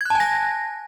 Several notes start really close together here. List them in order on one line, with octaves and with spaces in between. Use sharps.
G#6 F#6 A5 G#5 A#6